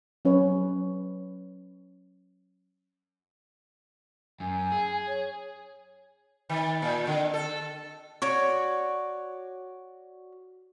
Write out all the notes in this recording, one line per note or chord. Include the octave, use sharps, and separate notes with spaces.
F#3 C#4 B4 C#5
F#2 G#5
G#4
C#5
D#3
A#2
D3
A4
F#4 C#5 D5